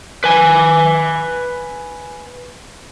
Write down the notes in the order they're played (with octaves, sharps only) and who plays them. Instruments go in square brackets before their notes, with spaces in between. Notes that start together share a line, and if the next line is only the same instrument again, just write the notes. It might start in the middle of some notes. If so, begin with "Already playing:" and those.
[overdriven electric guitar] B4 G#5